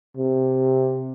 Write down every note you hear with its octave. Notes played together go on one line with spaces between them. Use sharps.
C3